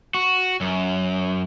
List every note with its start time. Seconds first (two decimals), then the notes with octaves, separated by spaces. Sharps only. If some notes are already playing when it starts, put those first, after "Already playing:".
0.14 F#4
0.61 F#2